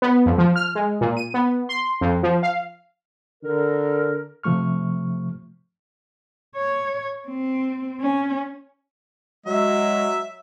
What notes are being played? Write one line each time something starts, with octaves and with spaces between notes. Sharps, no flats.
B3
F2
F3
F6
G#3
A#2
D#7
B3
C6
F2
F3
F5
D3 A#4
C3 F3 A3 C#6 F6
C#5
C4
C#4
F#3 G#3 E5